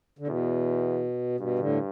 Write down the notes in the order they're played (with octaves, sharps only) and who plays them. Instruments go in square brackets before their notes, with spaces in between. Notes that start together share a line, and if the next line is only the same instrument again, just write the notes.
[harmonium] D3
[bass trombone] E2 [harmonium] B2
[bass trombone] G2 [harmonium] B2
[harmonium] A2 D3